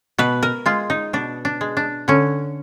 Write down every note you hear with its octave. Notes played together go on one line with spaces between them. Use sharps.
B2 B4
A#4
G#3 F4
D#4
B2 D4
D4
G#3
D4
D3 C#4